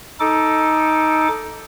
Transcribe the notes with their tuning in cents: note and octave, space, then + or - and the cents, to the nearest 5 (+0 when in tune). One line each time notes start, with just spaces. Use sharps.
D#4 +10 A4 +0 D6 +0